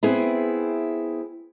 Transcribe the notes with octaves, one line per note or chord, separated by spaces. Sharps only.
B3 C4 E4 G#4